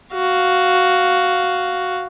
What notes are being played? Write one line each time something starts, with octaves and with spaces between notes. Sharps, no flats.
F#4 F5